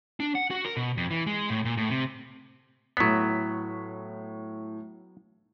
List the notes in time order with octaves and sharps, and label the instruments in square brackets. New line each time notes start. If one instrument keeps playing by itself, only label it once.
[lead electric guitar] D4
F#5
F#4
A#4
B2
F2
E3
G#3
A2
A#2
A2
C3
[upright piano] A2 B6 [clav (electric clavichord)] F#3 B3